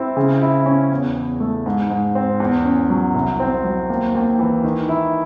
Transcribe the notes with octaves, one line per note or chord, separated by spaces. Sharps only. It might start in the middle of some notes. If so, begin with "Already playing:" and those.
Already playing: C4 E4
C#3
E4
C#4
E2
E2
A3
G#2
G#2
C4
E2
C#4
F#3
C2
C4
F#3
D#2
D#2
E3
D#3
E4